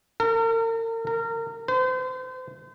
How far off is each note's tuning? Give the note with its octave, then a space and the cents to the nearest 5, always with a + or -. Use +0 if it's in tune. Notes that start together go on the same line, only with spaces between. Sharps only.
A#4 -40
A#4 -25
C5 -35